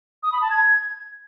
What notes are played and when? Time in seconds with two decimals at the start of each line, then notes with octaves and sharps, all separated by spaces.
0.23 D#6
0.32 B5
0.41 A5
0.51 G#6